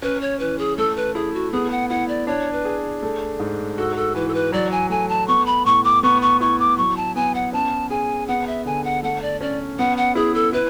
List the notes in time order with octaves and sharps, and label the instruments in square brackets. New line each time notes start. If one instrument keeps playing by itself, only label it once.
[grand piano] C#4 [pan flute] B4
[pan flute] C#5
[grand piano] E3 [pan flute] B4
[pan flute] G#4
[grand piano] A3 [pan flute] A4
[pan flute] B4
[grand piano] E4 [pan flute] G#4
[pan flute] F#4
[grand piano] B3 [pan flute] G#4
[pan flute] F#5
[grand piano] E4 [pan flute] F#5
[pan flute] D5
[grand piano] D4 [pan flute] C#5
[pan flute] B4
[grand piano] G#4
A3
G#2
[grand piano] F#4 [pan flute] A4
[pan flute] A4
[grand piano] E3 [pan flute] B4
[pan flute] A4
B4
[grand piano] F#3 [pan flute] D5
[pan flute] G#5
[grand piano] A3 [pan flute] G#5
[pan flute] A5
[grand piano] B3 [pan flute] C#6
[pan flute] B5
[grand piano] A2 [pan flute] C#6
[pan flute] D6
[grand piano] B3 [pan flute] C#6
[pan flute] C#6
[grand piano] E4 [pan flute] C#6
[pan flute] D6
[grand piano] F#3 [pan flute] C#6
[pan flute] A5
[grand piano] B3 [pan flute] G#5
[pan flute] F#5
[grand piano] C#4 [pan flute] A5
[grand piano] G#4 [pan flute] G#5
[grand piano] B3 [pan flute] F#5
[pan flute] E5
[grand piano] D3 [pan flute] G#5
[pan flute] F#5
[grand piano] A3 [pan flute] F#5
[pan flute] D5
[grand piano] C#4 [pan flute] D5
[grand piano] B3 [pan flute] F#5
[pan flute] F#5
[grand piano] E4 [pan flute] G#4
[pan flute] A4
[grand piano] E4 [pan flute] B4